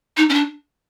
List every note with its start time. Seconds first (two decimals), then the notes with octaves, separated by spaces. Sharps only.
0.17 D#4
0.29 C#4
0.34 D4